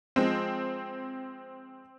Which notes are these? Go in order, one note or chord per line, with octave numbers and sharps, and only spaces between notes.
F3 G#3 C4